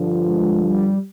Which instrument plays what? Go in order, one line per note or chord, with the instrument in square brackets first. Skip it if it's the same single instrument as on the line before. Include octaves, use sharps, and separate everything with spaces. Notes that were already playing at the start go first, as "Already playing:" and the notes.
Already playing: [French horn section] G2 D3 F3
[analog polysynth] G#3
G3